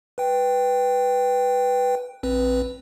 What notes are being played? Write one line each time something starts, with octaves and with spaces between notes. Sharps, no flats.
B4 G5
A#1 C4 B4